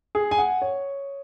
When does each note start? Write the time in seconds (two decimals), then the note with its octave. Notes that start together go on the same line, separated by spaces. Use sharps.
0.15 G#4
0.31 G#5
0.38 F#5
0.62 C#5